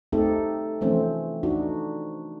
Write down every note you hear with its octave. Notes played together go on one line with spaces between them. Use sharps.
A3 C4 D#4 G4 A4
E3 F3 A3 C4 C#4
D4 D#4 F#4